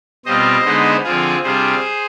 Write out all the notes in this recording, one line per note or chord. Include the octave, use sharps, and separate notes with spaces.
B2 G3 C4 F4 C5 D#5
D3 G#3 B3 D#4
D3 F3 C4 F4 G#4
C3 G3 D4 F4 G#4 C5